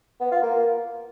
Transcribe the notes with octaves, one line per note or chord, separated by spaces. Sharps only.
B3
F4
A#3